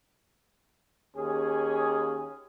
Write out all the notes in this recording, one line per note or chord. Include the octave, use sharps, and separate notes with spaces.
D#2 C#4 G#4